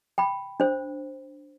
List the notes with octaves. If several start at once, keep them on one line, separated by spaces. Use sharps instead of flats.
G5 B5
D4 C5